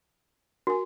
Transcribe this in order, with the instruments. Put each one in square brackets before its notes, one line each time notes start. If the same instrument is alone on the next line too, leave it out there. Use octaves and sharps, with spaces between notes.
[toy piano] F#4 [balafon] A#4 G#5